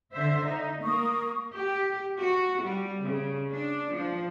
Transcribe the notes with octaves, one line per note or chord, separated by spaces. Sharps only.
D3 C5 E5
D#4
A#3 C#6 D#6
G4
F#4
G3
C#3
D4
F3